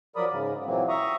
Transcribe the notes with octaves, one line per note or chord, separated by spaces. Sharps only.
F3 F#3 A#4 D5 B5 D#6
G#2 C#3
A#2 E3 F#3 A#3 C4
E5 A#5 C#6 D#6